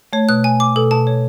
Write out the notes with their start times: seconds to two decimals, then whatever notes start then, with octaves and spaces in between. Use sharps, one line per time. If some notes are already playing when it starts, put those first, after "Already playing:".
0.13 A3 C#5
0.29 B2 F#6
0.44 G#5
0.60 D6
0.76 B2 A4
0.91 B2 A5
1.07 C#5